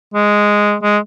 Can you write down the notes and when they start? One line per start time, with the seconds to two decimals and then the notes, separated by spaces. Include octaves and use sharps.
0.14 G#3
0.83 G#3